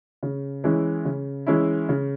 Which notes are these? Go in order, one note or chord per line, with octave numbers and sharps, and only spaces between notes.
C#3
E3 G#3 C#4 E4
C#3
E3 G#3 C#4 E4
C#3